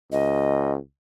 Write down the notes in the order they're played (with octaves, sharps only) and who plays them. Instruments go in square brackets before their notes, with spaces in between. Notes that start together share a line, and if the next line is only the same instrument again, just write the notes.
[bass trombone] C#2 [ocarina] D#5